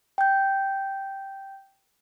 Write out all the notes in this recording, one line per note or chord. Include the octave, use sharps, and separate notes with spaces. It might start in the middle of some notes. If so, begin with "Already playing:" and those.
G5 G6